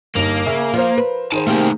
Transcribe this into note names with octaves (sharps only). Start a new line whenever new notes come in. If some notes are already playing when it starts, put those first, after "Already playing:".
G1 A#3 D#4 F7
C#3 E5
F3 A#4 C5
B4
D#3 G#4 C5 G#5 A5
A3 A#3 C4 D#4 G4